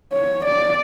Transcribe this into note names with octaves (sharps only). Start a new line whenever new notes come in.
C#5
D5